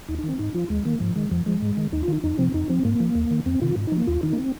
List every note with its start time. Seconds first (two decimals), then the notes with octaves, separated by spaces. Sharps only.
0.09 D#2 D#4
0.19 D#4
0.23 D#3
0.29 C4
0.39 G#2 D#4
0.54 F3 F4
0.69 D#2 G#3
0.85 D#3 A#3
1.00 G#2 F3
1.16 D#3 G#3
1.31 F2 F3
1.46 F3 G#3
1.62 G#2
1.77 D#3
1.92 D#2 D#4
2.03 F4
2.08 D#3
2.13 D#4
2.24 F2 D#4
2.38 C3 F3 C4
2.54 F2 D#4
2.69 F3 C4
2.85 G#2 A#3
3.00 F3
3.15 D#2
3.31 D#3
3.46 F2 C4
3.62 C3 D#3 F4
3.76 G#2
3.87 D#4
3.92 F3
3.97 A#3
4.07 D#2 F4
4.23 D#3 D#4
4.33 A#3
4.38 C4